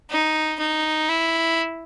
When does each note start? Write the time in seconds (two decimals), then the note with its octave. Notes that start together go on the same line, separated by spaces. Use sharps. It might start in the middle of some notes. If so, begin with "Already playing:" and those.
0.10 D#4
0.59 D#4
1.09 E4